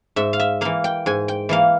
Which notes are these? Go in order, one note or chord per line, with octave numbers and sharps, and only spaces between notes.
G#2 E5
F5
E5
E3 A#3 F5
G5
G#2 G#5
G5
E3 A#3 F5